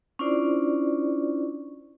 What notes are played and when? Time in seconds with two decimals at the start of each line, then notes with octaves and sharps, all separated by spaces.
0.19 C#4 D4 E4 F4 C5 D5